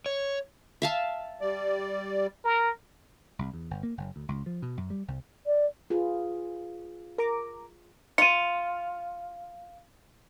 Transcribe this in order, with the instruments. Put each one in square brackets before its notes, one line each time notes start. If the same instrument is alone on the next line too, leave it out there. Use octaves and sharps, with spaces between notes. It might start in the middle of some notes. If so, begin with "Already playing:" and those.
[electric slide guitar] C#5
[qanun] E5 F5 A5
[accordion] G3 D5
[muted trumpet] A#4
[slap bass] C2
E2
G1
A#3
F#1
D2
C#2
F3
B2
F#2
G3
C2
[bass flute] D5
[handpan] F4 G#4 B4
[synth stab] A#4 A#5 D6
[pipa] F4 [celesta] C#7 D#7